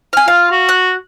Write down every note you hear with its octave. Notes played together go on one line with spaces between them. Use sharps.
F5 G#5
F4 F5
F#4
F#6